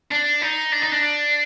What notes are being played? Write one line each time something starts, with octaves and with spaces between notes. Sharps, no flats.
D4
D#4
D4
D#4
D4